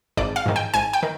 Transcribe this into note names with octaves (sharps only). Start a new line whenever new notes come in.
G#1 D5
F5
G#2 D#3
G5
G#1 G#5
G5
D#3